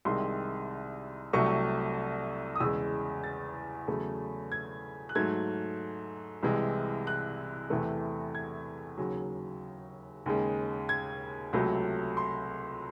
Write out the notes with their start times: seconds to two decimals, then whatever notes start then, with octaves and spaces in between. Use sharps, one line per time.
0.05 C2 C3 D#3 G#3 C6
1.33 C2 C3 F#3 A3 C#6
2.56 D#6
2.60 E2 C#3 G#3 E6
3.24 A6
3.87 E2 C#3 F#3 A3
4.52 G#6
5.09 F#6
5.15 G#2 F#3 A3 G#6
6.43 C2 C3 E3 G#3
7.07 F#6
7.70 E2 C3 E3 A3
8.35 G#6
8.98 D#2 C#3 F#3
10.26 D#2 C#3 G#3
10.89 G#6
11.53 C#2 C3 F#3 A3
12.17 C6